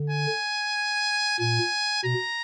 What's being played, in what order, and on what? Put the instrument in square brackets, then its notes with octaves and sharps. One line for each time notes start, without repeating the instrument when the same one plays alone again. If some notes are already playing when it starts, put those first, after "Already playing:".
Already playing: [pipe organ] D3
[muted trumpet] G#5
[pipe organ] A#2 [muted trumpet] G#5
[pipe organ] B2 [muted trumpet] A#5